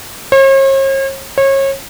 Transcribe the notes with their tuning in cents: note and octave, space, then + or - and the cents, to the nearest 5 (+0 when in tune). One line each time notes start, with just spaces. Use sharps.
C#5 -45
C#5 -30